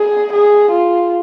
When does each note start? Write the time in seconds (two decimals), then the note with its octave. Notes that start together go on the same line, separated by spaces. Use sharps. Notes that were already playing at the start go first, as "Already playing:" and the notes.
Already playing: G#4
0.33 G#4
0.71 F4